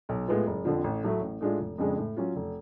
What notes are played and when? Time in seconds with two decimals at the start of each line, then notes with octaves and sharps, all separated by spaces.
0.09 B1
0.28 A2 G#3 B3 F4
0.47 F#1
0.65 F2 D3 F3
0.84 A1
1.03 A2 F#3 A3
1.21 A1
1.41 A2 G#3 D4 F4
1.59 F1
1.78 F2 C#3 G#3 D4
1.98 A2
2.17 F#3 C#4 F4
2.36 F1